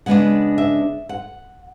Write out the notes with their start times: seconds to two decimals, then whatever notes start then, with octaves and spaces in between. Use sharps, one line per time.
0.06 C#3 G#3 B3 D4 F#5
0.58 E5
1.09 F#5